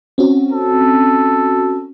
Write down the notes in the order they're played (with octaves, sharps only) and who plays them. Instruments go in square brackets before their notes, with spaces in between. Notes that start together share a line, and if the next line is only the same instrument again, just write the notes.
[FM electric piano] C4 C#4 F#4
[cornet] A4